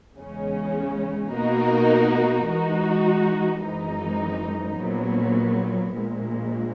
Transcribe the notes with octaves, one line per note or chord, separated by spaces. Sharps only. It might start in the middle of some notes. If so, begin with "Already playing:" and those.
E2 C#3 G#3 C#4
B2 A#3 D#4 F#4 A#4
E3 G#3 D#4 F#4
G#1 F#2 E3 G#3 D#4
A#1 A#2 F#3 B3
A#1 A#2 G#3